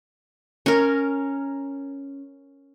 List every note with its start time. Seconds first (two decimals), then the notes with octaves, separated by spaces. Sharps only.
0.66 C#4 A#4